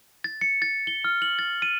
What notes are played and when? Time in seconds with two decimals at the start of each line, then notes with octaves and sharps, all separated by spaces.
0.24 A6
0.41 C#7
0.62 A6
0.87 G7
1.04 F6
1.22 F#7
1.39 A6
1.62 D#7